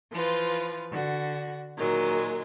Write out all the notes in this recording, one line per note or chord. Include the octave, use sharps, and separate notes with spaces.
E3 F3 F4 B4
D3 F#4
A#2 D#3 F#3 G#3